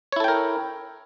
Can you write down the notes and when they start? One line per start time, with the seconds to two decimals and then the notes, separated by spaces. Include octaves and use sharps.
0.12 C#5
0.16 E4
0.20 A4
0.24 G5
0.28 A#4